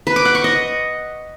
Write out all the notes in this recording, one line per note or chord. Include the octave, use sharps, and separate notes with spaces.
B4
D6
F#5
C#6
D#5